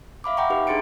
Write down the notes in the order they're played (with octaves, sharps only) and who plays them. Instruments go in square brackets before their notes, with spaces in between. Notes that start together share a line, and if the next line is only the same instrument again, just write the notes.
[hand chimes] E5 F5 B5 D6
E5 F#5 G5 A#5 C#6
D#4 G4 B4
D4 G#4 C6 A6 C#7 D7